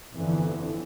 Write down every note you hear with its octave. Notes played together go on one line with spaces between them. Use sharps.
G1 F2 D3 E3